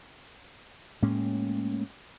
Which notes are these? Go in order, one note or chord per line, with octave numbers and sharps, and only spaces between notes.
A2 G#3 A#3 C#4